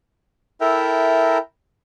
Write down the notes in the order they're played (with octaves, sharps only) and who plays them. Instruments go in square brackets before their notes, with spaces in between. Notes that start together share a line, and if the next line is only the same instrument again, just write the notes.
[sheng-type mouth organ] E4 A4 A#4 E5 G5 A#5